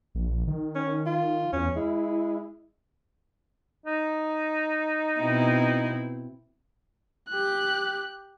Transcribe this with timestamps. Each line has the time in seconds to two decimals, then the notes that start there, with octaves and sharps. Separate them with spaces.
0.15 A#1
0.47 D#3
0.75 C#4
1.06 F4
1.53 E2 C#4
1.76 G#3 E4
3.86 D#4
5.20 B2 C4 E4
7.29 G4 F#6